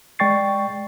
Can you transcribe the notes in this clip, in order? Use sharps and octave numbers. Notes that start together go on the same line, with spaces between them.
G#3 D5 G5 C#6 A6 C7